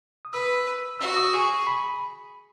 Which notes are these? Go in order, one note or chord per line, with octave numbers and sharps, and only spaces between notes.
D#6
B4 E6
F#4 E6
D#6
G#4 C#6
B5